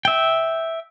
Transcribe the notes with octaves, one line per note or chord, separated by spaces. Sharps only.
E5 G5